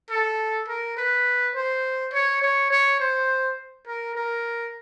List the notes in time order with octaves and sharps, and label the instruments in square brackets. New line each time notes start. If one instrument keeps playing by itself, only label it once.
[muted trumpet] A4
A#4
B4
C5
C#5
C#5
C#5
C5
A#4
A#4